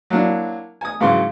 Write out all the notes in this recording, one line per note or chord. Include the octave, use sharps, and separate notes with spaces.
F#3 A#3 D4 E4
G#5 D#6
G#2 C#3 E3 F#3 C6